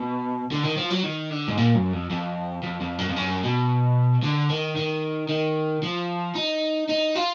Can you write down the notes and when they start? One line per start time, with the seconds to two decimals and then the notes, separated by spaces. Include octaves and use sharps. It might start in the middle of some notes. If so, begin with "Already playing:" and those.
Already playing: B2
0.51 D3
0.64 D#3
0.77 F3
0.90 F#3
1.04 D#3
1.31 D3
1.48 G#2
1.57 A#2
1.75 F#2
1.93 F2
2.11 F2
2.63 F2
2.81 F2
2.99 F#2
3.09 F2
3.16 F#2
3.44 B2
4.23 D3
4.50 D#3
4.77 D#3
5.29 D#3
5.83 F3
6.35 D#4
6.89 D#4
7.16 F4